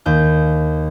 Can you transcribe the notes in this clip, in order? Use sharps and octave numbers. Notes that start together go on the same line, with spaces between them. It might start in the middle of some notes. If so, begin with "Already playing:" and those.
D#2 G6